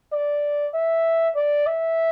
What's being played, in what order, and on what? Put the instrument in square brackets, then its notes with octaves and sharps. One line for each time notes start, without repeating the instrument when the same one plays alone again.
[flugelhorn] D5
E5
D5
E5